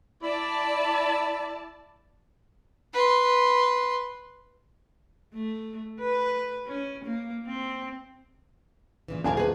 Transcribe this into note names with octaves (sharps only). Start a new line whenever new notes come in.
E4 D5 A5
B4 C6
A3
B4
C#4
A#3
C4
A#2 C#3 E3
D#1 D4 E4 A#4 G#5
G#4 B4